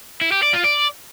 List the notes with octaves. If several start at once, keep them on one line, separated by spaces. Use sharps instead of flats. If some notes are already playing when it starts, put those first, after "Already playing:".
E4
G4
D5
F4
D5